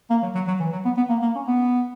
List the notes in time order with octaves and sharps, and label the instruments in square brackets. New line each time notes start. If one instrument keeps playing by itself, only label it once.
[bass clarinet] A#3
F#3
F#3
F#3
E3
F#3
B3
B3
A#3
A#3
C#4
B3